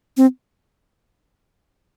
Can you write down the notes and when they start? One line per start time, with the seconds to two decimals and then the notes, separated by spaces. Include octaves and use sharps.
0.17 C4